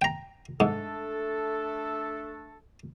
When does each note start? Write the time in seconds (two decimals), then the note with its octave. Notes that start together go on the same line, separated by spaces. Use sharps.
0.02 G5 A#5
0.60 G#2 A3 D4 A4